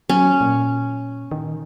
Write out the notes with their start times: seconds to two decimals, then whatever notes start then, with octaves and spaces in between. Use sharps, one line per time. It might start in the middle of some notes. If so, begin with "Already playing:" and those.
0.09 F#3 C#4
0.41 A#2
1.31 D#3